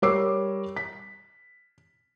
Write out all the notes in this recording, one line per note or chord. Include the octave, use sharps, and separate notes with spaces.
G3 A#4 C#5 D6 E6 C7
B6